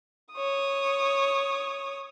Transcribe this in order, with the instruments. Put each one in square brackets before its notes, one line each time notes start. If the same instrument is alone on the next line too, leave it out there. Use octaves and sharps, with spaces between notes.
[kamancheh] C#5 D#6